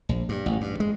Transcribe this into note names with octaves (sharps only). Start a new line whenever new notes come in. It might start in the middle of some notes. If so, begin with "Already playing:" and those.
A#1
G2
A1
G2
G#3